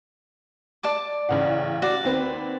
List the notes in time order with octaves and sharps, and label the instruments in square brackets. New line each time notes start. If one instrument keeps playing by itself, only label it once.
[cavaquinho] D5 A5 D6
[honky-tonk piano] A1 C#3 F#5
[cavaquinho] F#4 D5
[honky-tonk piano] D#2 C4 B4